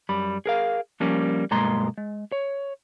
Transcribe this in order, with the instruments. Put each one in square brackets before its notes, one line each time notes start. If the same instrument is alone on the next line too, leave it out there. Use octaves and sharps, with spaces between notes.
[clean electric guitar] F#2 G3 B5
G#4 A#4 F5
F3 G3 A#3 C#4
B1 G2 G#3 A#3 A#5 C6
G#3
C#5